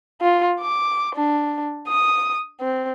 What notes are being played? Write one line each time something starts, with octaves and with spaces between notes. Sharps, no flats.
F4
D6
D4
D#6
C4